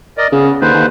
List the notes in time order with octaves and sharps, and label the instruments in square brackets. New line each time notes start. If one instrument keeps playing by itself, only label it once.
[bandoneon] A#4 D5 D#5
[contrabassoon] C#3 [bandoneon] B3
[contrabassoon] D#2 [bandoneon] D3 B4 C5
[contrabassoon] D#2